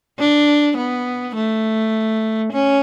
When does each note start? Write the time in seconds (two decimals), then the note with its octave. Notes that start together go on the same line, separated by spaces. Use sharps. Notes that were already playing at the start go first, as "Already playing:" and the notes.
0.19 D4
0.77 B3
1.36 A3
2.52 C#4